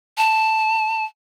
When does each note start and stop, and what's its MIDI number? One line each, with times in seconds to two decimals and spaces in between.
0.17 1.05 81